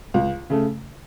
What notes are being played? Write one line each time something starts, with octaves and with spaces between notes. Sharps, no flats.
C#2
C#3 A3